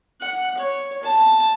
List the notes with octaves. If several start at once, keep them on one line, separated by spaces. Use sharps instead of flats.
F#5
C#5
A5